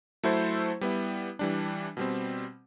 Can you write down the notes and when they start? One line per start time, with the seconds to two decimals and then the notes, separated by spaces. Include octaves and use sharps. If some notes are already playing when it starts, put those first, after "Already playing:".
0.24 F#3 A3 E4 A4 C5
0.81 G3 B3 E4
1.39 E3 G3 D4
1.97 B2 G3 C4